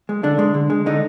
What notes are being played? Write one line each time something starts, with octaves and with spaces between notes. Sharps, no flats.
G#3
D3 D4
G#3
D3
G#3
D3 D#4